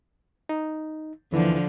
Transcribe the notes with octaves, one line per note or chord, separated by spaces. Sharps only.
D#4
D#2 D3 E3 F3